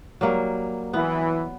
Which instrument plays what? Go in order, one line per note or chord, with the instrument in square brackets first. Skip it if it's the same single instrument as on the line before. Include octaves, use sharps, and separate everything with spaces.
[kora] F#3 G3 A#3
[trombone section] E3 [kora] B3